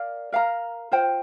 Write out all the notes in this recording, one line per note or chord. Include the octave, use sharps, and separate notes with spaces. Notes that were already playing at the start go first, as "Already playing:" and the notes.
Already playing: A#4 D5 F5
A#4 F5 A#5
F4 C5 G5